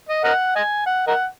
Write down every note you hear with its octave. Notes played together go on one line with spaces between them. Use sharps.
D#5
A#4 D#5 F#5
D#5 G#5
F#5
A#4 D#5 F#5